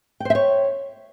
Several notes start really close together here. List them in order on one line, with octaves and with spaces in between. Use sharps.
G5 C5 E5 C#5